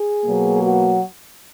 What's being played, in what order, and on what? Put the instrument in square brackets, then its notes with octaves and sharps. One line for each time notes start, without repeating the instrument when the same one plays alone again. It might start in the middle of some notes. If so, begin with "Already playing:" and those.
Already playing: [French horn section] G#4
B2 F#3 A#3
F#4